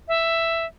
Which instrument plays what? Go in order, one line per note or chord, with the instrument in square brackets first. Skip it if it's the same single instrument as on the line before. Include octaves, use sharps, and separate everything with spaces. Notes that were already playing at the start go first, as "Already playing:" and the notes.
[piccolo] E5